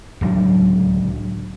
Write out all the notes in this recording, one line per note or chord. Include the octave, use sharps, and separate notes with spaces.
D1 C#2 F#3 D4